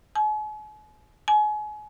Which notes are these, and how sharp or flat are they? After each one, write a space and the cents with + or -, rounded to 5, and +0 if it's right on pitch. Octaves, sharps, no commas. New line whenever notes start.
G#5 +45
G#5 +30